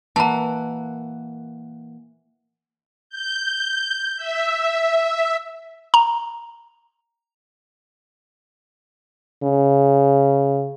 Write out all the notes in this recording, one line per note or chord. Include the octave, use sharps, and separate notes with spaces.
E3 A#3 F#5 A5 A#5
G6
E5
A#5
C#3